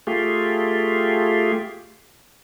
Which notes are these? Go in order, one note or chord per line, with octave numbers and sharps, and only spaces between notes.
A3 F4 G4 G#4